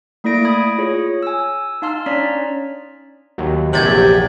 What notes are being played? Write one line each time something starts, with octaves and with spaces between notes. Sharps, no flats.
A3 A#3 E4 D5 A#6 D7
B5 D#6 G#6
F4 G#4 C#5
G#5 E6
D#4 F5 A5 C6 F6
C#4 D4 C#5 D5 A#5 B6
D#2 F#3
A#1 E2 C3 F#3 G4 G#6 A6 F#7